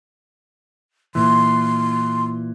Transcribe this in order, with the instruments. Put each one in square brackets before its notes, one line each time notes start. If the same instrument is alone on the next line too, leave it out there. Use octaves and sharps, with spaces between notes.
[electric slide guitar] A#2 E3 [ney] C6